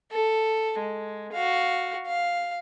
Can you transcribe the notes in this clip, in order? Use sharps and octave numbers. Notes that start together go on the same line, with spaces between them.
A4
G#3
F#4 F5
F5